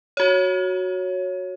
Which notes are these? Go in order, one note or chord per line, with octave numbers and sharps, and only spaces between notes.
F#4 C#5